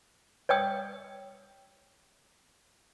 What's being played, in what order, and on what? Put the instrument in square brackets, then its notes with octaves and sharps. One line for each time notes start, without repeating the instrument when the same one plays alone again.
[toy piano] C#5 D5 G5 D#6